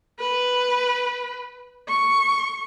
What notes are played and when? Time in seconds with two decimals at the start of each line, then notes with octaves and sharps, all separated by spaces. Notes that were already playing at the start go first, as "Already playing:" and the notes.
0.20 B4
1.89 C#6